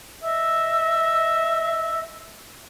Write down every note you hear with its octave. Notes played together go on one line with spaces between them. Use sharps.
D#5 E5 E6